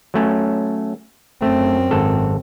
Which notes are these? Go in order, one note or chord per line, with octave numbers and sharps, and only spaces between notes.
F#3 A3 C#4
F#2 A3 C4
G#1 A4